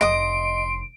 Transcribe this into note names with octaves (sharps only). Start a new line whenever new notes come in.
F1 D3 D#5 C6 D#6 D7